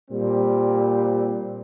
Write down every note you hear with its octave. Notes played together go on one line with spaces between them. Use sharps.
A#2 G3 C4